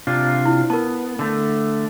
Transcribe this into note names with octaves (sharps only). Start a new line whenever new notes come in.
C3 D4 F4
E4
B3 A#4 A5
D3 A3